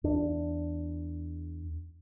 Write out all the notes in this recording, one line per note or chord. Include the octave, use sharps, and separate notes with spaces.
E2 D4